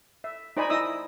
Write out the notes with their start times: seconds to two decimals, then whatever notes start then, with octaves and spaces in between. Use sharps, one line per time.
0.24 E5
0.57 D#4 C5 D5 D#5 G#5 B5
0.70 E4 D#5 D#6 E6